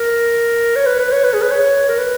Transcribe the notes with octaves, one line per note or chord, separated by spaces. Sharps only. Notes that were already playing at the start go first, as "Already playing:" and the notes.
Already playing: A#4
C#5
B4
B4
C#5
B4
G#4
B4
C#5
A#4
B4